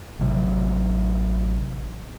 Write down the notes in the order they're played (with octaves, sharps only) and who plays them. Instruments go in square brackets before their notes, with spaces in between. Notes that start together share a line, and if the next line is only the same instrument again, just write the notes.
[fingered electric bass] A1 C3 F#3